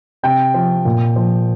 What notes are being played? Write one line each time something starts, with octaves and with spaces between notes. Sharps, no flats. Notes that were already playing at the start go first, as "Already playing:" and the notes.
C3 G5
F3
A#2
F3